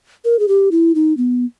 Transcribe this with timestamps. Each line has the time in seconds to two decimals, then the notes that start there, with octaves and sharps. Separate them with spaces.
0.25 A#4
0.39 G#4
0.48 G4
0.71 E4
0.95 D#4
1.17 B3